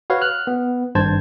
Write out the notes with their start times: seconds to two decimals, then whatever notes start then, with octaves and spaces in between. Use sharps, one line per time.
0.10 F#4 B4 C#5 F5
0.22 F6 F#6
0.47 B3
0.95 G#1 G2 C5 A5 G#6